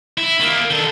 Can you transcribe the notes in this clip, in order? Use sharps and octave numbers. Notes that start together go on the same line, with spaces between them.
E4
D#3 A#3
D#3 A4